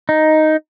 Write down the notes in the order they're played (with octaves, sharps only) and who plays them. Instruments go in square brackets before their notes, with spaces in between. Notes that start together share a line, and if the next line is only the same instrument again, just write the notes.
[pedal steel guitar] D#4